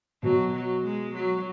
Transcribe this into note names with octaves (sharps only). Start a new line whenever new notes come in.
B2 F#3
F#3
G#3
F#3